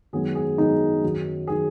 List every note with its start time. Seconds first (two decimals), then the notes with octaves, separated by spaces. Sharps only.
0.13 F#2 D#3 G#3 B3 G#4
0.35 G#4
0.58 F#2 D#3 G#3 B3 D#4
1.03 F#2 D#3 F#3
1.47 D#3 F#3 G#4